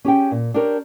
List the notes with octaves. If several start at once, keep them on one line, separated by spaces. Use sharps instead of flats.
C#4 G4 G#4 G5
A#2
D4 G4 A#4 C#5